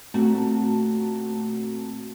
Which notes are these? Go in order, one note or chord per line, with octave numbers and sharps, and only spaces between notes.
A#2 A3 C4 F#4 A5 A#5